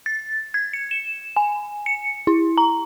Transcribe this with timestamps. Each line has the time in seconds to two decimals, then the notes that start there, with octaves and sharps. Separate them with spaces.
0.06 A6
0.54 G#6
0.73 C#7
0.91 E7
1.36 G#5
1.86 C#7
2.27 E4
2.58 A#5